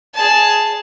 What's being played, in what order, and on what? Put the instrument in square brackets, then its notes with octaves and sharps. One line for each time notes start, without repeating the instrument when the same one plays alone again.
[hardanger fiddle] G#4 A5